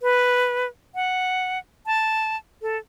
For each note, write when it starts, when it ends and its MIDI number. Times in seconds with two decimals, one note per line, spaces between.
0.01 0.66 71
0.95 1.58 78
1.86 2.36 81
2.62 2.77 69